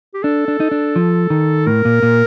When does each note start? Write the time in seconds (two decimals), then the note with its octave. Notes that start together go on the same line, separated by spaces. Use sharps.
0.14 G4
0.23 D4 A4
0.48 D4
0.60 D#4
0.71 D4
0.96 F3
1.30 D#3
1.66 A2 A#4
1.85 A#2
2.03 A#2